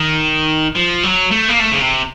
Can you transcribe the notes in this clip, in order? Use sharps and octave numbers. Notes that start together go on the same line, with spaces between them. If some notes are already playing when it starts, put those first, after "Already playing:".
Already playing: D#3
F3
F#3
A3
A#3
A3
C#3
C3